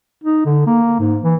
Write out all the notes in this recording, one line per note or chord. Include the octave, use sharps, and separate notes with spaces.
D#4
D3
A#3
G#2
E3